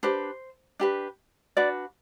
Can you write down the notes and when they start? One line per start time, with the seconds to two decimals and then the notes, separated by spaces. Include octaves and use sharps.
0.03 D4 G4 B4 C5
0.80 D4 G4 B4
1.57 D4 F#4 B4 D5